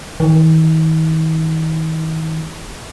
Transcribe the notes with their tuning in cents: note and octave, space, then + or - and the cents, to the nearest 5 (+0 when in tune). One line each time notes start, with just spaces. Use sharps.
D#3 +45